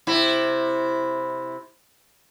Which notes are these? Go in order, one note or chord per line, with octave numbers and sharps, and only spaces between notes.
C3 E4